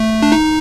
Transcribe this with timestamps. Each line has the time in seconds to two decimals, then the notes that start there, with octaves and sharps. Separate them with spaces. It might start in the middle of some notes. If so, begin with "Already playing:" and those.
Already playing: A3
0.22 D4
0.32 D#4